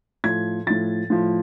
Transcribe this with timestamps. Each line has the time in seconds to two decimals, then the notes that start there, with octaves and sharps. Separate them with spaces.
0.24 A2 F3 G#6
0.67 A2 F3 A6
1.10 A2 F3